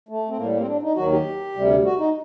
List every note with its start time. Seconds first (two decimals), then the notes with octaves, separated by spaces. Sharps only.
0.09 A3
0.29 C4
0.37 A2 G3 A#3
0.52 A#3
0.60 C4
0.67 D4
0.82 D#4
0.96 D#2 D#3 F#3 F#4
1.12 G4
1.56 D2 C3 G3
1.85 F#4
1.99 D#4